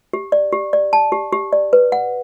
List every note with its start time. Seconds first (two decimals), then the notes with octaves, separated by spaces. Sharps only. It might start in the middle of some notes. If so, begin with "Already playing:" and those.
0.13 G4
0.32 D5
0.52 G4
0.73 D5
0.93 A5
1.12 G4
1.33 G4
1.53 D5
1.73 B4
1.92 F#5